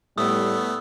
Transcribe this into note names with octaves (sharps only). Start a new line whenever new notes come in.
A2 G3 A3 B3 D#6 E6